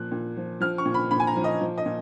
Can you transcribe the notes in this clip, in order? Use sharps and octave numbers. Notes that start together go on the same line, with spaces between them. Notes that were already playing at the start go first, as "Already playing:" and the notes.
Already playing: A#2 F3 F#6
A#2
F3
F3 F6
C#6
A#2
B5
A#2 B5
G#5
A#5
F3
D#5
F3
D#5
A#2